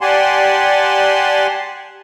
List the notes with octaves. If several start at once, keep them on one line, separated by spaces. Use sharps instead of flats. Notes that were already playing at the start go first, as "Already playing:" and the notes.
G4 D5 F#5 G#5 A5 C6